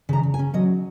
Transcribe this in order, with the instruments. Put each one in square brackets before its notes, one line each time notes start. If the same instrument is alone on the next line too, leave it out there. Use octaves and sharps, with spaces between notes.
[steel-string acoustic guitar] C#3 A#5
C#3
G#5
C#4
F#3 D#5